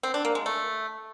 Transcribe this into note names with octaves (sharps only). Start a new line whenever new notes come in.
C4
D4
A#3
G#3
A3